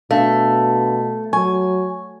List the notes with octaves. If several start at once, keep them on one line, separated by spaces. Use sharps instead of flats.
B2 A3 D4 F5
F#3 G#5 C#6